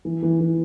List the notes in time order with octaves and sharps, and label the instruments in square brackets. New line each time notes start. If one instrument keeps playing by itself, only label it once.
[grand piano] E3
E3
E3